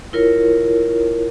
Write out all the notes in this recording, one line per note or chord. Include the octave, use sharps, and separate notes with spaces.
E4 F4 A#4 C#5